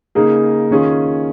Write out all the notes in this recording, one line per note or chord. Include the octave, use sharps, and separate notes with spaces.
C#3 A#3 D#4 G#4
D#3 C#4 F4 G#4